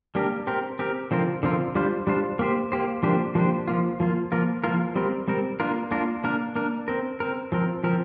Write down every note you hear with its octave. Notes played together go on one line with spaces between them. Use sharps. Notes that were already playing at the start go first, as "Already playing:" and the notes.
G3 A#3 D4 G4 A#4
C4 G4 A#4
C4 G4 A#4
D3 F3 C4 F4 A#4
D3 F3 C4 F4 A#4
G3 D4 F4 C5
G3 D4 F4 C5
A#3 G4 C5
A#3 G4 C5
F3 A#3 D4 G4 C5
F3 A#3 D4 G4 C5
F3 A#3 F4
F3 A#3 F4
F3 A#3 F4 A#4
F3 A#3 F4 A#4
G3 C4 A#4
G3 C4 A#4
A#3 D4 F4 A#4
A#3 D4 F4 A#4
A#3 D4 A#4
A#3 D4 A#4
C4 A#4
C4 A#4
F3 C4 A#4
F3 C4 A#4